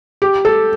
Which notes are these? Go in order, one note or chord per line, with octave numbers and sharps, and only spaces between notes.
G4
A4